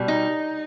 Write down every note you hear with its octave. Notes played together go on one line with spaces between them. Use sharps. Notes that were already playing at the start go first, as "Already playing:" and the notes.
Already playing: B2 G3
D#4